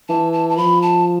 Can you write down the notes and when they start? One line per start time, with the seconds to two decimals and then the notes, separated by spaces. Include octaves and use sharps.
0.09 E3 A5
0.33 A5
0.50 A5
0.57 F3 B5
0.82 A5